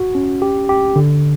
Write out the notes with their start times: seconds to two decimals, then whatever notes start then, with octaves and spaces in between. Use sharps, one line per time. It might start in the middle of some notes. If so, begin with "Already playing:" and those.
Already playing: F#4
0.15 C#4
0.42 G4
0.69 G4
0.96 D3